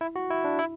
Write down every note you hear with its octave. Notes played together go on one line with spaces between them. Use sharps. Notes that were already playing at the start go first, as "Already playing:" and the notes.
E4
F#4
E4
D4
E4